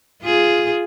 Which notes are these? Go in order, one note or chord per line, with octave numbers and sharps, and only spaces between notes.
F4 G#4